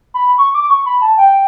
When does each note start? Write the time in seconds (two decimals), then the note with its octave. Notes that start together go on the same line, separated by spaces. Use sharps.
0.14 B5
0.38 C#6
0.54 D6
0.70 C#6
0.86 B5
1.02 A5
1.18 G5